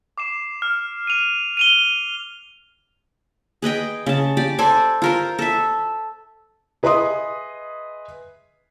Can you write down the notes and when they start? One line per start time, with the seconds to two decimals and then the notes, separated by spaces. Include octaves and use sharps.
0.18 D6 C7 E7
0.62 F6
1.07 D#7 F7
1.57 D#7 F7 G7
3.62 G#4 B4 D#5 G5
4.06 C#3 A5
4.37 G4 D5
4.58 A4 C5 D5 G#5
5.02 F4 A#4 C5
5.39 A4 E5
6.83 G#4 B4 D#5 E5 C6 D#6